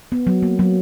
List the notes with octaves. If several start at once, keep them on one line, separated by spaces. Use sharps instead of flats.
B3
F#3
A#3
F#3